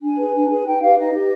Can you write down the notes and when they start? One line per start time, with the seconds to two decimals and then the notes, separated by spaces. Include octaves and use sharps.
0.01 D4 G#5
0.18 G#4 B4
0.33 D4
0.49 G#4 B4
0.65 D#4 G5
0.81 G4 B4 F5
0.97 D#4 D#5
1.13 G4 B4